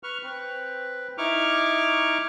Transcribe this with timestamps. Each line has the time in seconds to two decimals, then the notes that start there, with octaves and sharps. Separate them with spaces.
0.03 B4 C#6 F6
0.23 C4 B4
1.18 D#4 E4 C#6 D6 F6